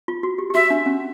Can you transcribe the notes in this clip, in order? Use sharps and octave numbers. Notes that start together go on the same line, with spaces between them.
F4
F#4
G4
G4
F#4 E5
D4
C#4